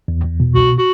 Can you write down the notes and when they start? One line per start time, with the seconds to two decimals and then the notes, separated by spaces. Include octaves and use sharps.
0.08 E2
0.24 E2
0.40 B2
0.55 C2 F#4
0.78 F#4